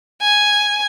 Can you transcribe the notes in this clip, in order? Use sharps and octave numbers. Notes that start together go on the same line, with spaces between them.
G#5